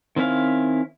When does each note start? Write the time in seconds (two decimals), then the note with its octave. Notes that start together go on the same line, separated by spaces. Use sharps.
0.16 D#3 C4 C#4 E4 F5